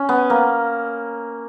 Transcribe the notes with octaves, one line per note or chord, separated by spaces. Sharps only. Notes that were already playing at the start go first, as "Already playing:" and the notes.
Already playing: C#4
B3
A#3